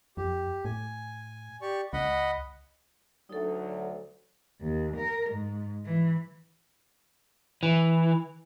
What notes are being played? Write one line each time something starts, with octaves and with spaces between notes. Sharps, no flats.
F2 G4
A2 G#5
G4 D5 C#6
C#2 D#5 F#5 B5
D2 F#3 D#4 A4
D#2
A#4
G#2
E3
E3